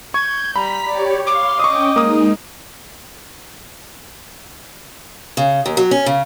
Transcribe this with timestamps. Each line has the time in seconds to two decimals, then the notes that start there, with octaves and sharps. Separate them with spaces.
0.14 C#6 G6 G#6
0.56 G3 A#5 B5 B6
0.88 G4 C#5 D5
1.27 C#5 F5 C6 D6
1.60 C#4 D#5 G5 C#6 D#6
1.96 G#3 A#3 D#4 D#6
5.37 C#3
5.66 D#2
5.77 F#3
5.91 C#4
6.06 C#3